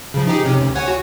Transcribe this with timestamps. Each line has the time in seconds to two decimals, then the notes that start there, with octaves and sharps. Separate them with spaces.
0.14 C#3 F3
0.27 D#4 G4 G#4
0.45 C3 C#4
0.61 D2
0.75 C#5 F#5 G#5
0.88 F#4